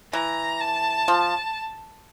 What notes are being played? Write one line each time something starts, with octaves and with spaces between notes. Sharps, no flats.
E3 A#5
A5
F3